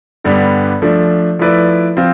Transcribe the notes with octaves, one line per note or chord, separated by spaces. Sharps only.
G2 D3 G3 B3 D4
F3 A3 D4
F3 A3 E4 B4 D5
F3 C4 F4